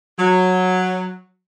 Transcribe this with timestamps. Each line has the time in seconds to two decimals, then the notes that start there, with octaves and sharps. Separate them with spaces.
0.19 F#3